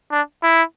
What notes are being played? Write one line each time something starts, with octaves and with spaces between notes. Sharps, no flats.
D4
E4